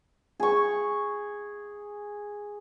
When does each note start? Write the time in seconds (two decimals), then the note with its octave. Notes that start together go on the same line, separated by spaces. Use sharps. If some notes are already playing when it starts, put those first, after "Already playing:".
0.40 G#4 C#6